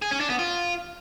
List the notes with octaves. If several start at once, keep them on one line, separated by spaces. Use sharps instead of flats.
G#4
C#4
D4
B3
F4